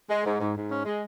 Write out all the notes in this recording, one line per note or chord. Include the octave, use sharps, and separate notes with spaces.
G#3
G#2
G#2
G#2
C#4
G#3